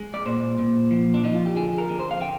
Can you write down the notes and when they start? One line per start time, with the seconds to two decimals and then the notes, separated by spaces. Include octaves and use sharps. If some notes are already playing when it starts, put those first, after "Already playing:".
Already playing: G#3
0.14 D5
0.25 A#2 C5
0.58 A#2
0.91 F3
1.14 D4
1.24 F3 D#4
1.35 F4
1.46 G4
1.56 D3 G#4
1.78 A#4
1.89 D3
1.99 C5
2.11 F5
2.21 D3 G5